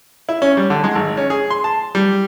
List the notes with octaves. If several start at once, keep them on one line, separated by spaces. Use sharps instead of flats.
E4
C#4
G3
D3
G#3
G#1
C#4
G#4
C6
A5
G3